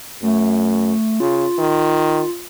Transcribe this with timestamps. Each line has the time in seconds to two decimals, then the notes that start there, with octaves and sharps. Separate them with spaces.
0.22 F#2 A3
1.20 C#3 F4
1.59 D#3